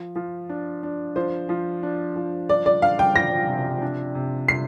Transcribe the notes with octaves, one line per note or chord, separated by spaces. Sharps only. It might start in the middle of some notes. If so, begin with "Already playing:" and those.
Already playing: F3
F3
D4
D4
F3 C5
F3
D4
F3
D4 D5
D5
D4 F5
G5
F3 A#6
C3
D4
C3
C3 C7